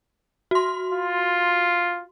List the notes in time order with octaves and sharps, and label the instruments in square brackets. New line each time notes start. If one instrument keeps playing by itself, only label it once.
[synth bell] F#4 C6
[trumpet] F4